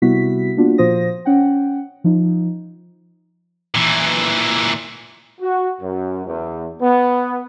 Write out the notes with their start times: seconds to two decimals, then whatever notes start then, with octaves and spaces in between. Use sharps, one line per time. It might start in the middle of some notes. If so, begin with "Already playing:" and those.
0.02 C3 G3 B3 E4 F#4 B6
0.56 A#3 B3 D4 F4 F#4
0.78 A#2 F3 F4 C5 D#6 A#6
1.25 C#4 F#5 G5
2.04 F3 D#4
3.75 A#2 E3
5.40 F#4
5.80 F#2
6.26 E2
6.80 B3